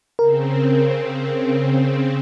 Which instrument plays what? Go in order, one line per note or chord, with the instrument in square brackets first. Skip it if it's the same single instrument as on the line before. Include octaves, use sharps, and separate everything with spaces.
[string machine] C#3 C4 [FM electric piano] A#4